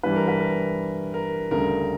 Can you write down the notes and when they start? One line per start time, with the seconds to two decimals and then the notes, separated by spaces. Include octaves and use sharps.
0.03 G2 E3 G3 B4
0.16 A#4
0.28 B4
0.40 A#4
1.14 A#4
1.51 D2 C#3 G3 A#4